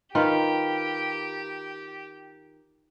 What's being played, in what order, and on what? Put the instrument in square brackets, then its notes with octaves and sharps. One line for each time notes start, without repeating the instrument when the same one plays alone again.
[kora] D#3 F4 B4 [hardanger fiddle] G4